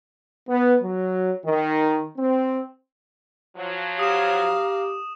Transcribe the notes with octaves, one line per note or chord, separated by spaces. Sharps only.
B3
F#3
D#3
C4
F3 F#3
G4 F5 A#5 D#6 E7